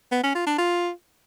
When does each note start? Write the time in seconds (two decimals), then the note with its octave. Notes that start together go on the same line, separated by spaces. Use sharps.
0.12 B3
0.23 C#4
0.35 F4
0.47 D4
0.58 F4